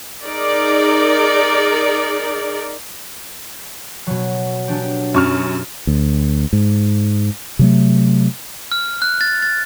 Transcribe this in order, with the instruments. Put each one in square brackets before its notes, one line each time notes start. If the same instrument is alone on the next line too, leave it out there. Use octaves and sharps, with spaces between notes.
[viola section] D#4 G#4 A#4 D5
[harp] B2 F#3
F#3 D4 G4
[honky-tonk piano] F#2 C#6 F6
[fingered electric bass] D2
G#2
C3 F#3 A3
[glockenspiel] F6
F#6
A6
A6